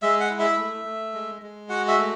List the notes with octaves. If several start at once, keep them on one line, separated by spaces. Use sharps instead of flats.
G#3 E5
F#5
E4
E5
A3
A3
G#3
G#3
F#4 F#5
E5
A3